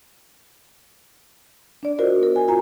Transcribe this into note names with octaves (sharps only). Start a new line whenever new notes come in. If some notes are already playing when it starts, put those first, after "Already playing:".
D4 D5
F4 F#4 A#4 C5 D#5
B3 A#4
G#5
F4 F#4 G#5 A#5